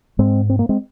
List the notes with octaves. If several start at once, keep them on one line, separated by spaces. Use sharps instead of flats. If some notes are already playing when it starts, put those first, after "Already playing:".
G#2 G#3 C4
C4
A#3
G#3 C4